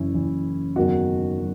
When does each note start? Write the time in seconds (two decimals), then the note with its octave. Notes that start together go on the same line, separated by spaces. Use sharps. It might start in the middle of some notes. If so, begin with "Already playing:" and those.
Already playing: F#1 F#2 E3 C#4 E4
0.14 F#1 F#2 E3
0.76 F#1 E2 D#3 F#3 D#4 F#4
1.39 F#3